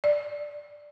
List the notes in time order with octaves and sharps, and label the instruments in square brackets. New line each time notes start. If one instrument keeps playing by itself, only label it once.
[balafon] D5